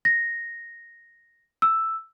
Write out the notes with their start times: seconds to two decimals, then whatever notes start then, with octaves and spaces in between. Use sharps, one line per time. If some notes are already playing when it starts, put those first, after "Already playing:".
0.05 A#6
1.62 E6